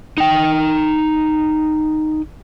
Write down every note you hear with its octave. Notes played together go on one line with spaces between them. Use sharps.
D#4 G5